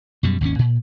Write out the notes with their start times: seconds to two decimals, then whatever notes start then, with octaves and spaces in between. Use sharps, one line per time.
0.23 F#2 B2 G3
0.41 G#1 D#2 C3 C#4
0.59 A#2